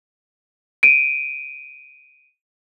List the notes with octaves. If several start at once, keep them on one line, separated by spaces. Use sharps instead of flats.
D7 D#7